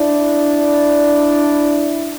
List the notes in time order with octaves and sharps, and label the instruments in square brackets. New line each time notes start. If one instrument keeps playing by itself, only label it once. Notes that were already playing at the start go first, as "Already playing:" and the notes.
Already playing: [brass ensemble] D4 E4